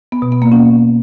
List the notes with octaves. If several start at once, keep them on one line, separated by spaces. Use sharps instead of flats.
B3
B2
B3
A#3
C#4